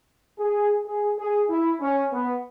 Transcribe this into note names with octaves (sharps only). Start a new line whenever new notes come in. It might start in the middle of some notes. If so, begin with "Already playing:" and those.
G#4
G#4
G#4
E4
C#4
B3